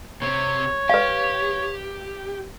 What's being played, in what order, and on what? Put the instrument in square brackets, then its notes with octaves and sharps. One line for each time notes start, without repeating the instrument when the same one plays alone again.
[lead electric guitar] C3 C4 [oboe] C#5
[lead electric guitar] G4 [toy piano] B4 F5